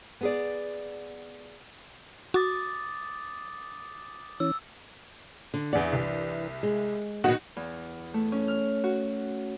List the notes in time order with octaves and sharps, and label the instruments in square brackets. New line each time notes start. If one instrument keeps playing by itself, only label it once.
[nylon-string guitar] B3 G#4 D5
[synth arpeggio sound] F#4 [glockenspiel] D6 D#6 A6
[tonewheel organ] E3 C#4 [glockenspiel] E6
[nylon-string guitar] D3
[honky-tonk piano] E2 F#5 [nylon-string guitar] E3 D5
[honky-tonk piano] C2
[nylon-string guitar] G#3
[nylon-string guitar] B2 D#3 [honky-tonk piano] D#4 F#4
[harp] E2
A3
C#4
F6
F#4